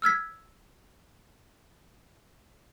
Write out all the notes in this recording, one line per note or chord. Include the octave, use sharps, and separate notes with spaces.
E6 F6 G#6 B6